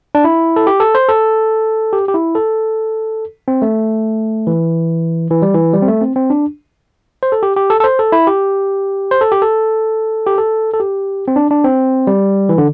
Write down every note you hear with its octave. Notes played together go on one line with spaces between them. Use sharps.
D4
E4
A4
G4
A4
C5
A4
G4
G4
E4
A4
C4
A3
E3
E3
G3
E3
G3
C4
A3
C4
C4
D4
C5
A4
G4
G4
A4
A4
C5
A4
E4
G4
C5
A4
G4
A4
G4
A4
A4
G4
C4
D4
D4
C4
G3
E3
D3